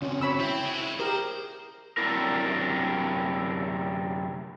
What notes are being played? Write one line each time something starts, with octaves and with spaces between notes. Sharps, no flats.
C#3 C4 C#4 F#4
C#5 B5 E6
C4 E4 E5
G#3 F#4
G4 G#4 A#4 C5
F#2 C3 C4 D4 E4 A#4